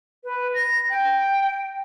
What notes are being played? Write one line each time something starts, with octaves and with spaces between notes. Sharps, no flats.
B4
A#6
G5